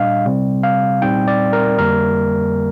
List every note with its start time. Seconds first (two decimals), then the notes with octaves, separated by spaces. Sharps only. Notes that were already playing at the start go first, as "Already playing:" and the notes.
Already playing: A#2 G3 D4 D#5 F5
0.26 C3 G3 C4
0.63 F5
1.02 A#2 G3 C4 D#4 G5
1.28 D5
1.53 A#4
1.78 F2 D3 G3 A#3 A#4